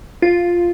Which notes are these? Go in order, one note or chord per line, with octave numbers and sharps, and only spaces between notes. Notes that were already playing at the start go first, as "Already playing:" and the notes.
F4